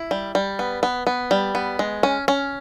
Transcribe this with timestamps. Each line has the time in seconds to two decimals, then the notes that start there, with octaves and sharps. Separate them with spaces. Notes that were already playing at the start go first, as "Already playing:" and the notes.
Already playing: E4
0.11 G3
0.35 G3
0.59 B3
0.83 B3
1.07 B3
1.31 G3
1.55 B3
1.79 G#3
2.03 C#4
2.28 C#4